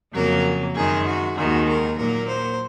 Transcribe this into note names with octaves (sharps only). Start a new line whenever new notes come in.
F2 C#3 F#3 A#3 A#4
F#2 D#3 G#3 G#4
F#4
D#2 D#3 G#3 F#4
A#4
A#2 F#3 A#3 A#4
C5